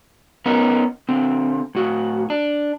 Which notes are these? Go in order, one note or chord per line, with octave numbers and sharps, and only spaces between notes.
B3 C#4 D#4 A#4
D3 C4
A2 F#4
D4